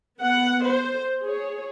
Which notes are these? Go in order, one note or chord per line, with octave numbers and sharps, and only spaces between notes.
B3 F#5
C5
G#4 C#5